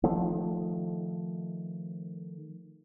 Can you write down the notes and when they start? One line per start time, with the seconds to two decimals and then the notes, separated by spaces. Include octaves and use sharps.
0.03 D#3 F3 A3